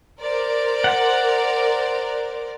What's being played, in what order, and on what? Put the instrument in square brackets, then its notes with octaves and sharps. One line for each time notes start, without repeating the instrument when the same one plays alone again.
[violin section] A#4 C5 D5
[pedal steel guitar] F#5